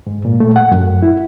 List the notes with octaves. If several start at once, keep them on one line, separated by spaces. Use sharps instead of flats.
G#2
A#2
A3
F#5
F#2
E4